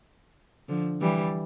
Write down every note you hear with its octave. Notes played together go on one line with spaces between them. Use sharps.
D3 F3
E3 G3